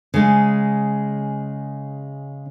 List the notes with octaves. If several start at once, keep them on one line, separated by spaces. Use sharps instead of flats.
C#3 G#3